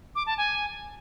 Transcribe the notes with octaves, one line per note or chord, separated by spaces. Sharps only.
D6
A5
G#5